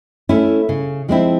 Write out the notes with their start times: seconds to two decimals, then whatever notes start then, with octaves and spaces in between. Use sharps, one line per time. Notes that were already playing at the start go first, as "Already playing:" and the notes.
0.29 A3 C#4 E4
0.69 C#3
1.08 F3 G#3 C4 E4